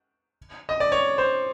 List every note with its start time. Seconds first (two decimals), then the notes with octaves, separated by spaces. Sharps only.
0.69 D#5
0.80 D5
0.92 C#5
1.18 C5